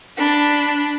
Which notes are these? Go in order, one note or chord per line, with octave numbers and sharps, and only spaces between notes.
D4 B5